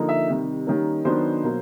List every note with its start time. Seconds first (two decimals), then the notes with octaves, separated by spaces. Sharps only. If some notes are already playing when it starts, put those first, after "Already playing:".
Already playing: D3 F3 A#3 D#4
0.09 E5
0.28 C3 D#3 G3
0.66 D#3 G3 A#3 C#4
1.05 D#3 F#3 B3 D4 C5
1.43 B2 F#3 A#3